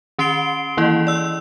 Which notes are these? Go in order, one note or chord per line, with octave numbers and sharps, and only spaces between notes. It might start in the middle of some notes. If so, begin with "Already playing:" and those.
D#3 C#4 C6 C7 D7 G7
D#3 E3 A#3 E4 D#5
D5 E6